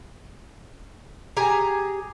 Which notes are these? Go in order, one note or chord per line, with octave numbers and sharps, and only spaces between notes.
G4 G#4 G#5 A#5